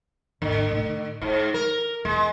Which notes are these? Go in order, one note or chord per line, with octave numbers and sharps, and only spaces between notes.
G#1 D#2 D3
A2 D#3
G#2 F4
D#3 A#4
E2 G#3